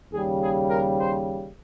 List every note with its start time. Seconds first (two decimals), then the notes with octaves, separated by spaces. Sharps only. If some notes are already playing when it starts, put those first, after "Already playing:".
0.11 D#2 C#3 G3 G#4
0.41 G#4
0.68 A#4
0.97 C5